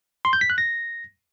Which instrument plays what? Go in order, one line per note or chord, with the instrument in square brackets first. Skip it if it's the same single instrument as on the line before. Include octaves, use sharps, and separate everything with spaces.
[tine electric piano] C6
G6
B6
F#6
A#6